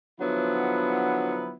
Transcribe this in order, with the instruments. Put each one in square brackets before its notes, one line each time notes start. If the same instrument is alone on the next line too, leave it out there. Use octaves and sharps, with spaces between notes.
[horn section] D3 F3 F#3 B3 E4